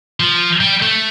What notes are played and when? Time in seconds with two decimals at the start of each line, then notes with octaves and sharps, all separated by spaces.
0.20 F3
0.61 G3
0.82 A3